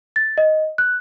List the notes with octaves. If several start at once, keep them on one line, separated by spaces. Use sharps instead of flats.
A6
D#5
F#6